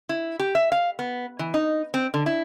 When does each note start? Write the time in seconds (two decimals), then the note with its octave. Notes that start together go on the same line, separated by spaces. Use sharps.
0.09 E4
0.40 G4
0.55 E5
0.72 F5
0.99 B3
1.39 E3
1.54 D#4
1.94 C4
2.14 D3
2.26 E4